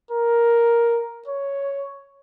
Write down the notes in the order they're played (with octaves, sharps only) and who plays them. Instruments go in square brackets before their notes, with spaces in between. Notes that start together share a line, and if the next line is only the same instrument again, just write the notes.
[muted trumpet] A#4
C#5